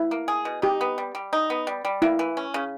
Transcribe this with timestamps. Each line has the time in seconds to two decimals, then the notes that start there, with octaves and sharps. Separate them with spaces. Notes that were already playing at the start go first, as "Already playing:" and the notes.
Already playing: E4
0.11 A#3
0.28 G#4
0.45 B2
0.62 D#4 G4
0.81 B3
0.98 G3
1.15 G3
1.33 D#4
1.50 B3
1.67 G3
1.85 G3
2.02 A#3 E4
2.19 E3
2.37 C#4
2.54 C#3